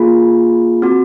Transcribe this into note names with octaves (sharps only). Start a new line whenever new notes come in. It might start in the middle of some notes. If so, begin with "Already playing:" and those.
Already playing: A#3 F4 G#4
C4 F#4